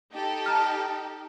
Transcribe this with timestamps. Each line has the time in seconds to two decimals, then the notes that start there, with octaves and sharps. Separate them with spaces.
0.13 D#4 G4 A4
0.46 A5 A#5 F6